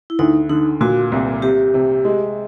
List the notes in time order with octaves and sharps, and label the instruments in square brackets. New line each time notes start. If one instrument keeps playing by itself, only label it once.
[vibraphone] E4
[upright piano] D2 [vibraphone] D#4
[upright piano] D3 [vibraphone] D#4
[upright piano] A#2 [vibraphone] F#4
[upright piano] C2
[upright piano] C3 [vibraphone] G4
[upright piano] C3
G#3